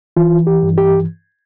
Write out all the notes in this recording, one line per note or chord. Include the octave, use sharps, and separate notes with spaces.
E3 F4
G4
G2
G4